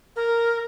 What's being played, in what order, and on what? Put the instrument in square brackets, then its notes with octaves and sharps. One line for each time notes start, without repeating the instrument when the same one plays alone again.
[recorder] A#4